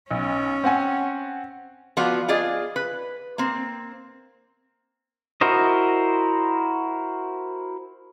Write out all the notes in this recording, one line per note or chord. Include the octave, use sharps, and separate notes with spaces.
B1 C#4
C4 F#5 G#5
F3 B3 F4 F#4 D5
F4 G#4 D5 D#5
B4
A#3 C4
E4 F#4 A#4 C5 D#5